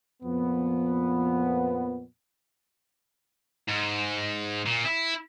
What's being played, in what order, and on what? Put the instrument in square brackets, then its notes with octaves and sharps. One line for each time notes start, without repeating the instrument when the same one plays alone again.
[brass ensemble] F2 A#2 F3 B3
[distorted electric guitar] G#2
A#2
E4